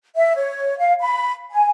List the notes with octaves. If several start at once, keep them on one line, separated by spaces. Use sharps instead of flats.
E5
C#5
F5
B5
G#5